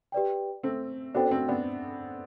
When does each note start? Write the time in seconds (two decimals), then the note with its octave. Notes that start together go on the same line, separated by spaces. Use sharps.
0.12 G4 B4 D5 G5
0.63 A3 C4
1.15 B3 D4 F#4 A4 C5 G5
1.25 D4
1.31 A3 C4
1.48 B3 D4